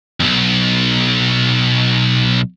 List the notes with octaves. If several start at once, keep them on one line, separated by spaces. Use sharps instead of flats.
B1 F2